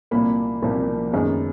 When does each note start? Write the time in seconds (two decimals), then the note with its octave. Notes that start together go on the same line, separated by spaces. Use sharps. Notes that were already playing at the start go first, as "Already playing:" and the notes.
0.11 C2 A#2 F3 A#3 B5
0.62 C2 A#2 F3 A#3
1.12 F#2 D#3 G#3 B3